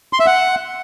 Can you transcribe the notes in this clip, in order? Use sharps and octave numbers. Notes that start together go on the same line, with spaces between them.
C6
E5
F#5